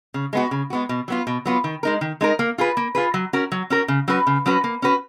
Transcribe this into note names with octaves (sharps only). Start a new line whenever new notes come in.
C#3
G#3 B3 F#4
C#3
G#3 B3 F#4
B2
F#3 B3 F4
B2
F#3 B3 F4
D#3
G#3 D#4 A#4
D#3
G#3 D#4 A#4
A#3
F4 G#4 B4
A#3
F4 G#4 B4
F#3
C#4 F#4 A#4
F#3
C#4 F#4 A#4
C#3
F#3 C#4 F#4 B4
C#3
F#3 C#4 F#4 B4
A#3
C#4 F#4 B4